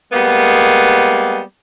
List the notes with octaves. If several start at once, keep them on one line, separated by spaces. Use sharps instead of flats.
G3 G#3 A#3 B3